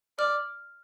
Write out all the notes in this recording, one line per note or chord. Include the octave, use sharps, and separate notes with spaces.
D5 F6